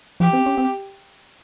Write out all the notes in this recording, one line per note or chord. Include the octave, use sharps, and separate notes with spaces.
F3 G4
C4
C#4
C4